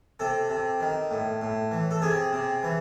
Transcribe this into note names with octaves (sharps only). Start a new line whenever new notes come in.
C3 A4
C3
D#3
A2
A2
E3
A4
C3 G#4
C3
E3